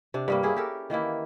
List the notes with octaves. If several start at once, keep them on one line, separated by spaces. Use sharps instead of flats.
C3 D4
G2 G3 A#3
C#4 E4 G#4
G4 A4 A#4
D#3 E3 A#3 E4